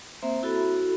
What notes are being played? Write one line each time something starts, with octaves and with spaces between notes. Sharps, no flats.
A#3 C4 C5 E5
E4 F#4 A4 B5